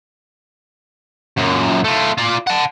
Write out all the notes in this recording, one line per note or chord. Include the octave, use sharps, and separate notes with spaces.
F#2 A#2
A3 F4
F4 D5
F#5 A5